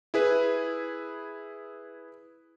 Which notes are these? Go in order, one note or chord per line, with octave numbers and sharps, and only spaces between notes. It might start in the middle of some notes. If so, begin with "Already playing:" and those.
E4 G#4 B4